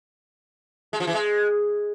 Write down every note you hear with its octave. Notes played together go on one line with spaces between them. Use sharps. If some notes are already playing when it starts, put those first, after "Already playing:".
G#3
F3
E3
G#3